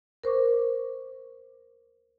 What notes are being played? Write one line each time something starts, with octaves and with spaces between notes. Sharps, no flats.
A#4 C5 C#6 D6